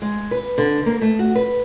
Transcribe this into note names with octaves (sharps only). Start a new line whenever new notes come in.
G#3
B4
D3
A#3
A3
F#4
B4